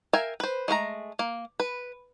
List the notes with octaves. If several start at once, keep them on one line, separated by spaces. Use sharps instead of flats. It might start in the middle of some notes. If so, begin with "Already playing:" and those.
A#4 E5 F5 G5 G#5
B4 C5
G#3 A3 A#4 A#5
A#3
B4